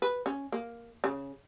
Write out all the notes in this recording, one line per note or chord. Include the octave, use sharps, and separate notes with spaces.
B4
C#4
A#3
C#3